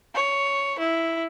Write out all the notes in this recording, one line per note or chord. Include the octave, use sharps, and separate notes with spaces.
C#5
E4